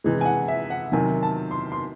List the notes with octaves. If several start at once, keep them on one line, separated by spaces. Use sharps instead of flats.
C3 E3 G#3
G#5
F#5
E5
F#5
C3 D#3 F#3 G#5
A5
C6
C6